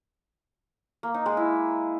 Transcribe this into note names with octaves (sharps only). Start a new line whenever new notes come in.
A#3
D#4
G#3
E4